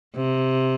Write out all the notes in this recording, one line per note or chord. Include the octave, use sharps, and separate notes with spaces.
C3